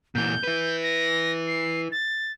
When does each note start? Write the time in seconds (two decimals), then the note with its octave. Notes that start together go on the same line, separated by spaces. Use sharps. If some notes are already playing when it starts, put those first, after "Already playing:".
0.15 A#2 E3 G6
0.44 E4 B4
0.83 A#6
1.47 C7
1.92 A6